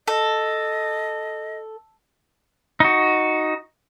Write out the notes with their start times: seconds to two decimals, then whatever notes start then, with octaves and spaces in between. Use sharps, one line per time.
0.07 A4 D#5
2.80 D#4 F#4